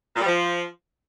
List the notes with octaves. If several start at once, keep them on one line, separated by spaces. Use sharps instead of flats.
A#2
G3
F3